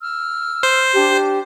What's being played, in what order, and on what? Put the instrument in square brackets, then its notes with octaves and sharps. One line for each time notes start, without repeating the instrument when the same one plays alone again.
[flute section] E6 F6
[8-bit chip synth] C5
[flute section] D4 G4 A5